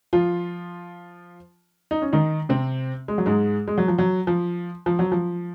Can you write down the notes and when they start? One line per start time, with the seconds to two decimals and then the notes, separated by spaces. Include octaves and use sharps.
0.13 F3 F4
1.91 D#4
2.02 C#4
2.13 D#3 D#4
2.49 C3 C4
3.08 G#3
3.18 F#3
3.26 G#2 G#3
3.68 G#3
3.78 F#3
3.88 F3
3.98 F#3
4.27 F3
4.86 F3
4.99 F#3
5.12 F3